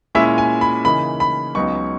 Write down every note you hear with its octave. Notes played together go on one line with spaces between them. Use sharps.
A#2 G#3 C#4 E4 E5
G#5
B5
C#3 E3 A#3 D#4 B5
B5
C#2 C#3 F#3 B3 D#4 C#6